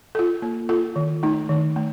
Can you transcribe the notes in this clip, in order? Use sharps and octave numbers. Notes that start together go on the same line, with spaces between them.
F4 A4
A#3
F4 A4
D#3
A3 D#4
D#3
A3